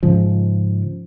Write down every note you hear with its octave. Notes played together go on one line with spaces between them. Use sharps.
G#2 C#3 F3